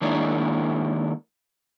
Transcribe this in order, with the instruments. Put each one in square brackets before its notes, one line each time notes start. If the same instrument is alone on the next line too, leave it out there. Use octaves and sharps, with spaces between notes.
[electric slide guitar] D#3 G#3 A#3 D4 E4 C#5